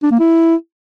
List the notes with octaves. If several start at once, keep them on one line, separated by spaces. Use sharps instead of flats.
D4
A#3
E4